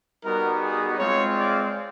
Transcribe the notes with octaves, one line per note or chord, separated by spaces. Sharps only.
G3 B3 D#4 F#4 A#4
G#4
G#3 C4 F4 C#5
D5